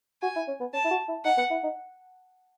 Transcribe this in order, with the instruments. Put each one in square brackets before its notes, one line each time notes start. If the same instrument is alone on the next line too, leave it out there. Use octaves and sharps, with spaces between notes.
[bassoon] F#4 [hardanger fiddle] G#5
[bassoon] E4
C#4
B3
[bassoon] C#4 [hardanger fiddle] A5
[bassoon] E4
F#4
E4
[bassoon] D#4 [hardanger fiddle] F#5
[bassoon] B3
E4
D#4